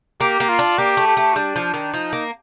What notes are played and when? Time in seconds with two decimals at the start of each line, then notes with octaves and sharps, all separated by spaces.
0.21 A#3 G4
0.40 A#3
0.49 F4
0.59 D4
0.78 A#3 G4
0.97 A3
1.07 G4
1.17 A3
1.35 G3 D4
1.56 F3
1.74 D#3
1.94 F3 D#4
2.13 A#3